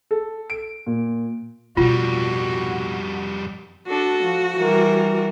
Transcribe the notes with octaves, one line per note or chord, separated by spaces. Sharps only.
A4
D7
A#2
F2 B2 G3 B3 F4 F#4
D4 F#4 A4
F3
E3 G3 A#4